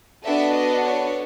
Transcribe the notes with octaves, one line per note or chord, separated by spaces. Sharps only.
B3 D4 F#4 A4 E5
D#5
C#5